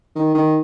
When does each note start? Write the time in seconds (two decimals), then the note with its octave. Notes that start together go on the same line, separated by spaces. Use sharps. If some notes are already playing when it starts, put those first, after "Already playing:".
0.15 D#3
0.35 D#3